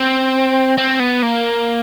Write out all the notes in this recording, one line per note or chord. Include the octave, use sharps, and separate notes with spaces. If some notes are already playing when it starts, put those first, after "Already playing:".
Already playing: C4
C4
B3
A#3